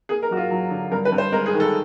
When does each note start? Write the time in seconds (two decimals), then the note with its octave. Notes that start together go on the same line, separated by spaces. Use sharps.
0.09 A#3 G#4
0.23 A#4
0.30 F#2 F#4
0.37 F4
0.51 F#3
0.70 D3
0.92 G2 A#4
1.05 B4
1.12 G2
1.18 C5
1.32 G#3 A#4
1.46 G#4
1.53 D#3
1.60 A4